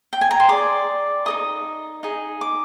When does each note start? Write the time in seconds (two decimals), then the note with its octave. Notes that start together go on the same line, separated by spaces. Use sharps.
0.13 G5
0.21 G#5
0.31 A#5
0.40 C6
0.48 G#4 D5 D6
1.26 D#4 A#4 D#5 D#6
2.03 D#4 G#4
2.41 D6